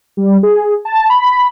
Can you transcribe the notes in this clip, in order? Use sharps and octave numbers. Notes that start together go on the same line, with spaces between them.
G3
G#4
A5
B5